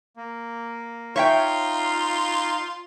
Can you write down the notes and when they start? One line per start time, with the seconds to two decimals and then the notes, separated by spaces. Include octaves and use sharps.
0.16 A#3
1.16 D#4 F4 C#5 E5 F5 G5